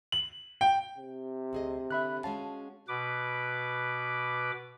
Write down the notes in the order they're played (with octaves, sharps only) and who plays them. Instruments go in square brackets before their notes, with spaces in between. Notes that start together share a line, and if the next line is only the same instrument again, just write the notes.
[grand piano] F#7
G5
[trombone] C3
[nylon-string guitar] D2 G#4 D#5
[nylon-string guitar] D3 [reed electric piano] E5 B5 F#6
[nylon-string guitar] G#3 C#4 F5 [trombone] F#4 [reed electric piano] A5
[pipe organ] B2 B4 D6